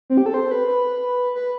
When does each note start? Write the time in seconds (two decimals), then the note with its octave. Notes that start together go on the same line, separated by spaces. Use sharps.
0.10 C4
0.17 G4
0.26 A4
0.34 C5
0.51 B4
0.68 B4
1.35 B4